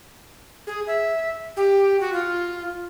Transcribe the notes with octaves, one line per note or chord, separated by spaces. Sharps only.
G#4
E5
G4
F#4
F4